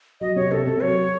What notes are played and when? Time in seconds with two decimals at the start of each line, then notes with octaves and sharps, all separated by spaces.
0.21 F#3 D#5
0.36 C3 C#5
0.51 C3 A4
0.66 C3 A4
0.82 F#3 C#5